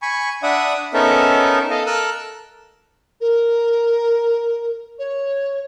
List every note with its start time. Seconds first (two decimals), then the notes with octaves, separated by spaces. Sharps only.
0.02 G#5 B5 C#6
0.43 D4 D5 E5 F#5 B5 D#6
0.94 B3 C#4 D#4 A4 A#4 E5
1.70 A4 D#5 F5
1.86 A4 A#4 E6 F#6
3.20 A#4
4.98 C#5